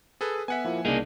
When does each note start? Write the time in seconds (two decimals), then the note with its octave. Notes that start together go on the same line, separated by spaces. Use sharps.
0.21 G#4 A4 B4
0.48 B3 E5 F#5 G#5 B6
0.65 F3 A#3 E4
0.85 C2 C#3 A#3 D4 D#4 G#4